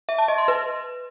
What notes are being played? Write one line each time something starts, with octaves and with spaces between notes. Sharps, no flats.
E5
A5
D#5
C6
B4